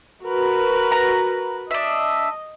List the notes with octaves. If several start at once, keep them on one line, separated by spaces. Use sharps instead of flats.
F#4 A#4 B4
A#5
D4 D#5 E5